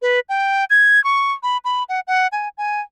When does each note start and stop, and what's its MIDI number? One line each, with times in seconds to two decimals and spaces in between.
0.02 0.20 71
0.29 0.65 79
0.70 1.02 92
1.04 1.32 85
1.43 1.57 83
1.65 1.83 83
1.89 2.00 78
2.07 2.27 78
2.32 2.48 80
2.58 2.80 80